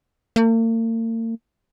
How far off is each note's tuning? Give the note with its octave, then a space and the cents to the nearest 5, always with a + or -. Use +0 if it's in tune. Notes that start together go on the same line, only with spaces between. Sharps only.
A#3 -45